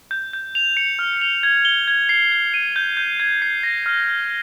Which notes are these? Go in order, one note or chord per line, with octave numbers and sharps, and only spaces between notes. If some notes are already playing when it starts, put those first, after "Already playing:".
G6
G6
F7
C#7
F6
F7
G#6
G7
G#6
C7
G#6
D#7
G6
G6
G#6
C7
A#6
F6
F6